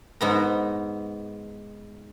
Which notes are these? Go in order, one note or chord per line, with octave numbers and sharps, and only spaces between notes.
G#2 B3 A#5